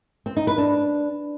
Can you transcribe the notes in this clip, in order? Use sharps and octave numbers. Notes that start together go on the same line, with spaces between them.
C4
D#4
B4
D4